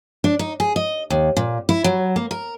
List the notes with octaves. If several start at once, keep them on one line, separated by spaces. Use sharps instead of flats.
D4
D#4
G#4
D#5
D#2
A#2
E4
F#3
A#3
A#4